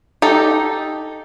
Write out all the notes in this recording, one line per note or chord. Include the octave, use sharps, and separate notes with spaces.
D#4 G4 A4